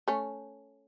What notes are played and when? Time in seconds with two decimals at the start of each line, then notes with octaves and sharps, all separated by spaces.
0.08 A3 C#4